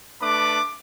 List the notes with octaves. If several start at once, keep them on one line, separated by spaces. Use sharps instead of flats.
A3 D4 B4 B5 D6